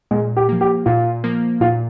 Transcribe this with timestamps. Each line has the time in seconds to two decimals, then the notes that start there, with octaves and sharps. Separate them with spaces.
0.11 A#2 G#3
0.37 G4
0.49 F3 A#3
0.61 G4
0.86 A#2 F4
1.24 F3 A#3
1.61 A#2 F4